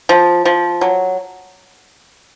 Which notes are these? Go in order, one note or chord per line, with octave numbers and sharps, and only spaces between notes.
F3
F3
F#3